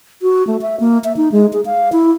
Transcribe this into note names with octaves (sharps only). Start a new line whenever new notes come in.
F#4
A3
E5
A#3
E5
D#4
G#3
G#4
F5
E4